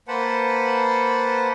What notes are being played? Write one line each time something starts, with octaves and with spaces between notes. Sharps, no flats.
A#3 B4 C5 F#5 A5